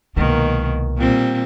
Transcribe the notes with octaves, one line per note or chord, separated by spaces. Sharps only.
C2 B2 D#3 G#3 A#3
A#2 G3 C4